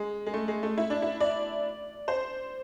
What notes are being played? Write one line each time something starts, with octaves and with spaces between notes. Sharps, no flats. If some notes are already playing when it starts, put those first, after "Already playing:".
Already playing: G#3
G#3
A3
G#3
A3
E4
D4
E4
D5
C5